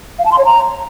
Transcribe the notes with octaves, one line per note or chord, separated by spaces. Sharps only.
F5
A5
C6
C#5
A#5